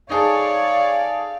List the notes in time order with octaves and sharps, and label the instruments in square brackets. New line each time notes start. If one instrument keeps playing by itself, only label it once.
[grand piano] D#4 G#4 A4 [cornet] C#5 [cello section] D5 [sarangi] F5